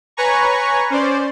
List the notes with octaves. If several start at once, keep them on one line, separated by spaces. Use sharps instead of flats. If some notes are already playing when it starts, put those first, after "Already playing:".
B4 C#5 G#5 A#5 C#6
C#4 C5 D5